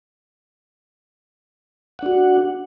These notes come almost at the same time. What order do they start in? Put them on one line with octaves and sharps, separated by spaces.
F#5 D4 F#4